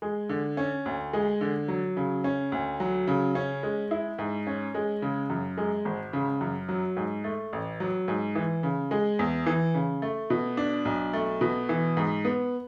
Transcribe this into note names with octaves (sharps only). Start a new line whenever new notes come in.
G#3
D3
C#4
D2
G#3
D3
F#3
C#3
C#4
D2
F#3
C#3
C#4
G#3
E4
G#2
C#4
G#3
C#3
F#2
G#3
G#1
C#3
F#2
F#3
G#2
A3
A1
F#3
G#2
E3
C#3
G#3
E2
E3
C#3
A3
B2
D4
B1
A3
B2
E3
G#2
B3